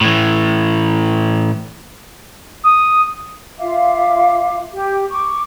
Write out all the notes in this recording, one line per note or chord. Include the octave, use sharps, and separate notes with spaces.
A2 E3
D#6
F4 E5 F5 D6
G4
C#6 D6